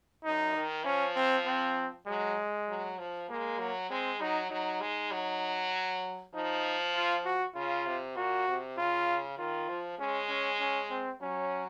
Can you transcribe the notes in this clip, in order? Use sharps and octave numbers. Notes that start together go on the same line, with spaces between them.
F#2 D#4
D#3
F3 C#4
C4
C4
F#3 G#3
F#3
F3
G#3 A#3
F#3
G#3 C4
F#3 D#4
F#3 D#4
G#3
F#3
F3 D#4
F4
F#4
C#3 F4
C3
A#2 F#4
C3
C#3 F4
D#3 F4
F3
G#3 C#4
C#4
C#4
C4
F#3 C#4